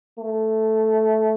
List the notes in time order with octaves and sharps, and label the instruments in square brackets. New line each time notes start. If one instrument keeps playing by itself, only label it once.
[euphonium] A3